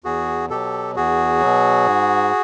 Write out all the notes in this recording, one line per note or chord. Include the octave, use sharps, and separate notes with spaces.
E2 F#4 G#4
B2 F#3 G4 A4
E2 F#4 G#4
B2 F#3
G#2